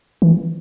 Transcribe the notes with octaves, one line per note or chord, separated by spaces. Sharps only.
E3